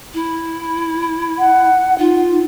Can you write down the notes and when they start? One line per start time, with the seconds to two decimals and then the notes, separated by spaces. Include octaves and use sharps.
0.14 E4
1.39 F#5
1.99 D#4 F4